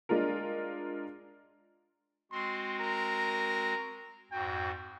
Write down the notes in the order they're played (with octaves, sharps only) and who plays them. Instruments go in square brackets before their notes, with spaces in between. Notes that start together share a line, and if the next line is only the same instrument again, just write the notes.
[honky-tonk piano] G#3 D4 F4 A#4
[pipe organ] G#3 C4 F#4 [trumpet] C6
[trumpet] A#4
[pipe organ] F2 G#2 F#4 [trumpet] G5